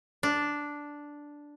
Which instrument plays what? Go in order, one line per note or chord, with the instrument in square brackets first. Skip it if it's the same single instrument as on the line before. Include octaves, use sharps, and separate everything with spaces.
[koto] D4